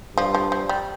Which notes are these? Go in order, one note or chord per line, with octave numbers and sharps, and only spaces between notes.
G2 F3
F3
F3
G3